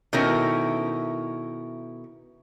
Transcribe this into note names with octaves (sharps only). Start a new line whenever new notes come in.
B2 D#3 A3 C#4 E4 A#4